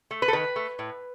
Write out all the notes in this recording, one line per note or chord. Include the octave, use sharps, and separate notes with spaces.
A3
B4
A4
D#3 B4
A3
A2